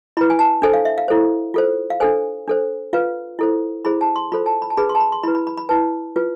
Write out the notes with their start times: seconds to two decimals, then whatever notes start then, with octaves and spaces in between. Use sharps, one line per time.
0.17 E4 B5
0.21 B4
0.30 G#5
0.39 A5
0.62 D4 A4 C5 G#5
0.74 F5
0.85 E5
0.98 F5
1.08 E4 A4 C5
1.54 F4 A4 C5
1.90 F5
2.00 D4 A4 C5 G#5
2.48 D4 A4 C5
2.93 F4 B4 F5
3.39 E4 A4 C5
3.85 E4 G#4 C5 B5
4.01 A5
4.16 C6
4.32 F4 A4 C5 B5
4.46 A5
4.62 B5
4.70 A5
4.77 D4 G#4 B4 B5
4.89 C6
4.95 A5
5.00 B5
5.12 C6
5.23 E4 B4 B5
5.35 B5
5.47 B5
5.57 B5
5.69 E4 B4 A5
6.16 F4 B4